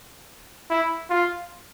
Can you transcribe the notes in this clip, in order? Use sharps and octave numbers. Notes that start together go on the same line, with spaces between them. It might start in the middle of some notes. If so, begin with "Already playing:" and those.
E4
F4